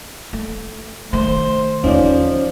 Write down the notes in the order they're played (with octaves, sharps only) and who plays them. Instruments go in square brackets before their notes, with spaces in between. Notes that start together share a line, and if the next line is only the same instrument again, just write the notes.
[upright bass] A3
[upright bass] D#3 A3 [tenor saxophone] C5
[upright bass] E2 D3 [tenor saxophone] F3 [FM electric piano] C#4 D#4 D5